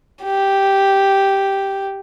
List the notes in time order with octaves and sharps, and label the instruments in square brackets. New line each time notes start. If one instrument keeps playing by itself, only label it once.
[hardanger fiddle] G4